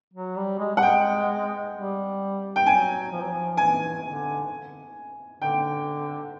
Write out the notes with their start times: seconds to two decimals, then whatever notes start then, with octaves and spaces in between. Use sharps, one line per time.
0.14 F#3
0.36 G3
0.59 G#3
0.76 G3 F#5
0.82 G#3 G5
1.74 G3
2.56 G5
2.66 F#3 G#5
3.12 F3
3.21 F#3
3.29 F3
3.57 E3 G#5
4.04 D3
5.42 D3 G5